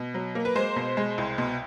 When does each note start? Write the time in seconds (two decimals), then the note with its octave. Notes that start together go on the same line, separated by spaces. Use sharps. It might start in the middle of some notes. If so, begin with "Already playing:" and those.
Already playing: B2
0.14 F#3
0.35 A#3
0.45 B4
0.55 G#3 C5
0.76 B2
0.97 G#3
1.18 C2
1.38 B2